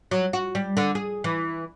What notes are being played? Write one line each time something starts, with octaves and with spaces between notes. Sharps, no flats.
F#3
F#4
G3
D3
G#4
E3